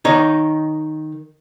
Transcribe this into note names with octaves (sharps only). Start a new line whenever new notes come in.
D#3 D#4 C#5